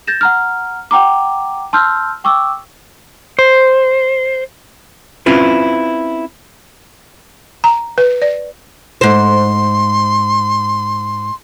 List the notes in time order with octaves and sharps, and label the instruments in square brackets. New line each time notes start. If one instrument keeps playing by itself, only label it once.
[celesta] G6 A6 A#6 E7
F#5 A#5 F6
F#5 G5 A#5 D6
A5 C6 E6 F6 G6
G5 C#6 D6 E6
[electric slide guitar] C5
[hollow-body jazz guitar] C4 C#4 E4 F4 B4
[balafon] A#5
B4
D5
[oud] G#2 C5 [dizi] C6